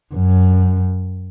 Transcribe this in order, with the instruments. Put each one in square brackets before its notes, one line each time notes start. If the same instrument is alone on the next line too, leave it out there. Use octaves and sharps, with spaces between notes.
[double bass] F#2